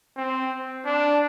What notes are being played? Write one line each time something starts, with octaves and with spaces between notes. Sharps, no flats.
C4
D4